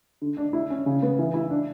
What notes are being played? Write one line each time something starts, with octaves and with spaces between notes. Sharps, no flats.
D3
D4
E4
C#4
C#3
B3
E3
E4
D4